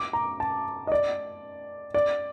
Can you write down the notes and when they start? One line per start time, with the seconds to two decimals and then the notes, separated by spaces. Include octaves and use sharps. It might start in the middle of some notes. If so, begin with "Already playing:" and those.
Already playing: D6
0.13 A#5
0.40 A5
0.87 D#5
0.92 D5
1.94 D5